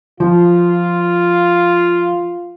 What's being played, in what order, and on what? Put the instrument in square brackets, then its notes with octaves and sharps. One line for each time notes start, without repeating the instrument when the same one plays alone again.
[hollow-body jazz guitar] F3 [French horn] F4